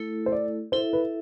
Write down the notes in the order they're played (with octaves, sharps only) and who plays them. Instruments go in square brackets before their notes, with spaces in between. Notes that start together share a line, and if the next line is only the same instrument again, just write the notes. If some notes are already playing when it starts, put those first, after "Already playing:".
Already playing: [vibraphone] A3 E4 A4
[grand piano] C5
D5
[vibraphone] E4 A4 E5 [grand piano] C5
[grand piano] B4